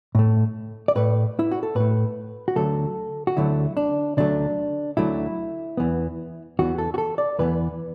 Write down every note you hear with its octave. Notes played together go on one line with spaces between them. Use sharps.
A2 A3
D5
A2 A3 B4
E4
F#4
A4
A2 A3 B4
F#4
D2 D3 F#3 A3 A4
F#4
D2 D3 F#3 A3 E4
D4
D2 D3 F#3 A3 D4
D2 D3 F#3 A3 E4
E2 E3 B3
E2 E3 B3 F#4
A4
F#4
A4
D5
E2 E3 B3 B4